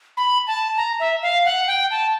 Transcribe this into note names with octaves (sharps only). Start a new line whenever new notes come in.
B5
A5
A#5
E5
F5
F#5
G5
A5